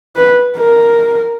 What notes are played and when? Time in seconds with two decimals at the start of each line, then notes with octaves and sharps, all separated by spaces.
0.16 B4
0.57 A#4